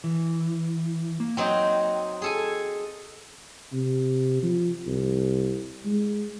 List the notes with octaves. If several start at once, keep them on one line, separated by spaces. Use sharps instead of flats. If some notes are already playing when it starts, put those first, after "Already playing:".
E3
A#3
F#3 C4 D#4 G5
G#4 A4 G#5
C3
F3
C2
G#3